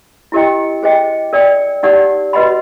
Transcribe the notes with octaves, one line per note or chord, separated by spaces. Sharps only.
E4 G4 A#4 D#5 G5
G#4 C5 D#5 G5
A#4 D5 G5
D#4 G4 A#4 D5 F#5
F#4 B4 D#5 F#5 B5